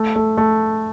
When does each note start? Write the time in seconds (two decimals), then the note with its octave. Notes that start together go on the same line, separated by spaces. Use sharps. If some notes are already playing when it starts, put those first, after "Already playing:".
Already playing: A3
0.16 A3
0.37 A3